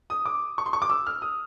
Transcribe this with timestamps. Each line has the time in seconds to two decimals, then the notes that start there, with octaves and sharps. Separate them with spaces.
0.10 D#6
0.26 D6
0.58 C#6
0.66 C6
0.73 C#6
0.82 D6
0.90 E6
1.07 F6
1.22 D#6